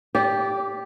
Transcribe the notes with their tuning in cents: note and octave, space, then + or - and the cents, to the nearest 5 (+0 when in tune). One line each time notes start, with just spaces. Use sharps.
G4 +0 D5 -20